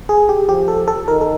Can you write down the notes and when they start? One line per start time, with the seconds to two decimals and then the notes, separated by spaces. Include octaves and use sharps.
0.09 G#4
0.29 G4
0.48 F3 G4
0.68 A4
0.88 A4
1.07 D#3 A#4
1.21 A4